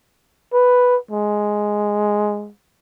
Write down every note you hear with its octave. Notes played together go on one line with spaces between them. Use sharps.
B4
G#3